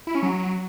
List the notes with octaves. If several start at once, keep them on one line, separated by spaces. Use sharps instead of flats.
E4
C#4
F#3